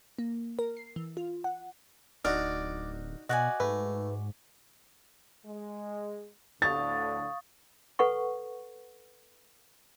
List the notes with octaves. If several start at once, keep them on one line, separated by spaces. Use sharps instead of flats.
A#3
A#4
C7
E3
F4
F#5
D1 D4 D#4 F#4 D5 F6
B2 F#4 D5 D#5 G#5 F#6
G#2 A3 B4
G#3
D2 A2 D3 F5 C#6 D#6 A6
A4 B4 F#5 C#6